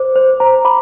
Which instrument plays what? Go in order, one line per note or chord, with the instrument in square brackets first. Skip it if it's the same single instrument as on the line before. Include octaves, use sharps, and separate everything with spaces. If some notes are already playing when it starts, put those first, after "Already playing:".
Already playing: [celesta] C5 D6
C5
[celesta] C5 [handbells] A#5
[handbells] B5 [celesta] D6